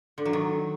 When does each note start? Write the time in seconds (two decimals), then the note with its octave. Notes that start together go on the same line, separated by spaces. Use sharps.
0.18 D3
0.25 F#3
0.33 D#3